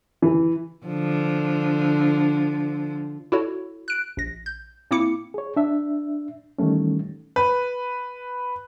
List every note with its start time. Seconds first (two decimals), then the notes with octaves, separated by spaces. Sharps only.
0.22 E3
0.86 D3 F3
3.32 E4 F#4 A4 C#5
3.88 F#6 D7
4.17 A#1 A#6
4.46 G6
4.91 A#2 A#3 C4 E4 D6 C#7
5.34 G#4 C#5
5.56 D4 E5
6.59 D#3 E3 G3 A3 C#4
7.36 B4